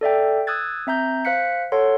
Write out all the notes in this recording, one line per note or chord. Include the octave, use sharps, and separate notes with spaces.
A4 D5 E5 G5
D#6 E6 F#6 G#6 A6
C4 E5 A#5 G6
C5 F5 F#6 B6 C#7
A4 C#5 F#5 C6